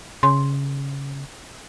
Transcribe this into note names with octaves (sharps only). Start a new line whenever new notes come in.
C#3 C6